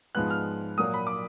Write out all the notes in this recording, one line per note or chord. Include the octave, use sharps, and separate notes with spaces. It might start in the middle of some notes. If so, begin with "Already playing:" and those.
G#2 F3 G#3 B3 F#6
F6
A#2 F#3 A#3 D#6
B5
D6